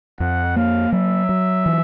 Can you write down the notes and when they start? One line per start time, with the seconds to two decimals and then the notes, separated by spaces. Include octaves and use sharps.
0.20 F2 F#5
0.56 A#3 F5
0.92 F#3 E5
1.29 F#3
1.66 E3